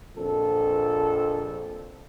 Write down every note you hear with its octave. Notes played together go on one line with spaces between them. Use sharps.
A#1 F2 A4